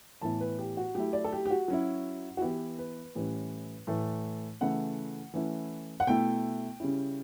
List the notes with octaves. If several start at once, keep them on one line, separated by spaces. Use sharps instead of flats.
A2 E3 B3 E4 A5
B4
G4
F#4
F#3 A3 E4 G4
D5
A4
G4
G4
F#4
F#3 C#4 E4
F#4
E3 B3 E4 G4
B4
A2 E3 G3 C#4
A2 E3 A3
C#3 E3 A3 E4 F#5
E3 A3 C#4 E4
F#5
B2 A3 E4 G5
C#3 G3 C#4 E4